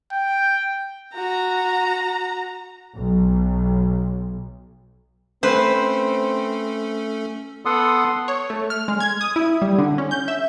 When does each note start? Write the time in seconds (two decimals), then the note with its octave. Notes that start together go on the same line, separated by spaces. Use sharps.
0.12 G5
1.14 F#4 A#5
2.96 B1
5.43 A3 C4 C#4 A4 B4 C5
7.65 B3 A4 F#5 C6 D#6
8.28 C#5
8.50 A3
8.70 F6
8.88 G#3
9.00 G#6
9.21 D#6
9.36 E4
9.62 G3
9.78 D3
9.98 C#4
10.11 G6
10.28 E5